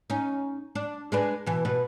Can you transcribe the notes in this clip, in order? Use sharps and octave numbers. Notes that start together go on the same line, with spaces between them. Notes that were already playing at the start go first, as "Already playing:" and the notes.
C#4 D#4
D4
G#3 D4 B4
B2 E3
B2 B4